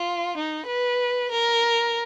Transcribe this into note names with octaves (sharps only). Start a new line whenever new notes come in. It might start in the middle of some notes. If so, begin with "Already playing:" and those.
Already playing: F4
D#4
B4
A#4